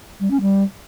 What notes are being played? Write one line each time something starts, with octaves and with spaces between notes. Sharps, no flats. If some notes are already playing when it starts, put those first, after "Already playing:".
G3
C#4
G3